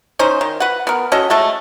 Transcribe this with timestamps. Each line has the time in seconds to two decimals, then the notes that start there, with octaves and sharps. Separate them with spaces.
0.19 C#4 D#4 C5
0.41 D#3
0.60 B4 F#5
0.87 B3 A#4
1.12 C#4 F#4 A4 D#5
1.30 G#3 A3 A4